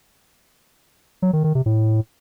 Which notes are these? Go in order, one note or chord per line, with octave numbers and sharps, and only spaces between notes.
F#3
D#3
D#3
C3
A2